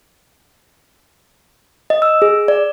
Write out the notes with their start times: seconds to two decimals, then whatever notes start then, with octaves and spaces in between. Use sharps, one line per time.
1.90 D#5
2.02 E6
2.22 G#4
2.48 D5